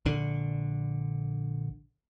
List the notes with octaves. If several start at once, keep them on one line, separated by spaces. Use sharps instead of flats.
A#1 D3